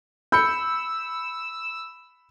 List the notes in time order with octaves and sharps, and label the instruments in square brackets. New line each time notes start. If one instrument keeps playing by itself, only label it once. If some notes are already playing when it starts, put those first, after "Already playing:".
[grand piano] B5 C#7 [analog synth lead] E6 [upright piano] G6